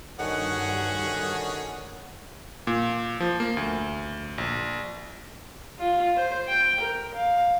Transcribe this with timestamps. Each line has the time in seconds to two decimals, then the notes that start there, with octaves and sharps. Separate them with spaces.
0.19 G2 D3 D#3 C#4 F#4 G#4 F#5
2.67 A#2
3.20 F3
3.40 A#3
3.57 D2
4.38 A#1
5.79 F4
6.16 C5
6.48 G5
6.81 A#4
7.15 F5